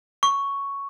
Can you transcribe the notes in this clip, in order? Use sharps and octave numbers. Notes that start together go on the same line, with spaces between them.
C#6